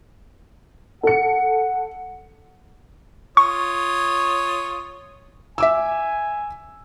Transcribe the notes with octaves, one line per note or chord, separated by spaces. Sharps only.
A4 F#5 C#7
F4 C#5 C#6 D#6
E5 G#5 D6 E6